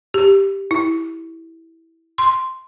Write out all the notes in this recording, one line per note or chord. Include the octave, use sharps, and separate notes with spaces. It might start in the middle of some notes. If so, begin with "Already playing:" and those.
G4
E4
C6